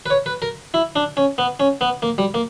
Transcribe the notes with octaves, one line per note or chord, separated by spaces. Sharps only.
B4
C#5
B4
A#4
E4
D4
C#4
B3
C#4
B3
A#3
G3
A#3